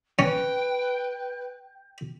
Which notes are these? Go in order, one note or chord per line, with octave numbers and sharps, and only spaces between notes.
C#4 B4 G5